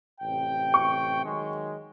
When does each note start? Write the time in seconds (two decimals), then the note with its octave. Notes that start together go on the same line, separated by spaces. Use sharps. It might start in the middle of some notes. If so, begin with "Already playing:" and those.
0.21 A1 C3 G5
0.74 C#6
1.24 D#3 F#3 G#3